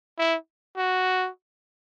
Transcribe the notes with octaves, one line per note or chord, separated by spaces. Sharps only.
E4
F#4